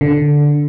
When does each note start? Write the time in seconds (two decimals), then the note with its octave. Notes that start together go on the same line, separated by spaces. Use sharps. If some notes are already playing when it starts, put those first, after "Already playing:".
0.01 D3